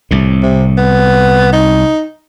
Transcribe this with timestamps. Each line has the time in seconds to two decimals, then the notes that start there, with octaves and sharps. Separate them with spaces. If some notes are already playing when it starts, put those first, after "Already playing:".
0.11 C2 A2
0.43 C3
0.77 B3
1.53 D#4